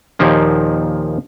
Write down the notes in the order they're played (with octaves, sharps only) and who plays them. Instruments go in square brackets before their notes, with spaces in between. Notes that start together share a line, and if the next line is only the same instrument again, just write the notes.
[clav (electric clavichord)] D#2 A#2 D#3 F3 A#3